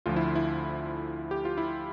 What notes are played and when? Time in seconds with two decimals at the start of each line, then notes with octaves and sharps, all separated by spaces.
0.06 D2 D3 F3 F4
0.16 E4
0.35 E4
1.31 G4
1.45 F4
1.58 E4